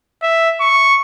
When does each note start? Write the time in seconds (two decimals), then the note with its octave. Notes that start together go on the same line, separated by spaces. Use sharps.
0.23 E5
0.61 C#6